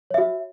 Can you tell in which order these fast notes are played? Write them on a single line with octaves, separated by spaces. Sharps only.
C#5 E5 F#4